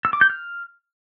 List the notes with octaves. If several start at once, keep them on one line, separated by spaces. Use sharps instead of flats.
E6
D6
G6
F6